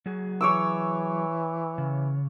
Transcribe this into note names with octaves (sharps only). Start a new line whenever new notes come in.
F#3 F#4 G#4
E3 C#5 D6 E6
C#3